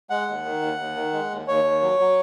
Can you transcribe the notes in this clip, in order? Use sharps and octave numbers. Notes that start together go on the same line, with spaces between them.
G#3 F#5
D#2
D#3
D#2
D#2
D#3
G#3
D#2
D#2 C#5
D#2
F#3
F#3